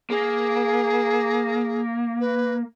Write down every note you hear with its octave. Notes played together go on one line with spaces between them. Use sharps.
A#3 G#4
B4